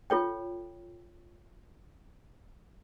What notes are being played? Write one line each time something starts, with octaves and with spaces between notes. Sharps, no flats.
F4 A4 C#5 G5